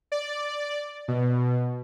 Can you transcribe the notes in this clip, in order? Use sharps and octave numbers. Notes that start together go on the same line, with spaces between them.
D5
B2